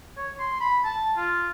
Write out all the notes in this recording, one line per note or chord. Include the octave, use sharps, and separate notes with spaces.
C#5
C6
B5
A5
F4